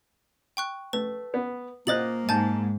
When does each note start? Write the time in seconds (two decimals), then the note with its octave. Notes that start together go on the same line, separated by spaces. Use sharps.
0.57 G5 C#6 F#6
0.93 A3 B4
1.34 B3
1.87 A#2 A#3 C5 D#5 F#6 A6 F#7
2.29 G#2 G#5 A5 G6